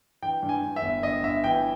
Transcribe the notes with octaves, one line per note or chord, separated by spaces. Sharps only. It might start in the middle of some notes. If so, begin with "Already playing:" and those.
E3 G5
G2
G#5
G2
E5
G1
G1 D#5
G1 E5
E3 G5